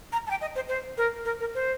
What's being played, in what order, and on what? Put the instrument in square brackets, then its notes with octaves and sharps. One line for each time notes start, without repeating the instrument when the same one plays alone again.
[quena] A#5
A5
G5
D#5
C5
C5
A#4
A#4
A#4
C5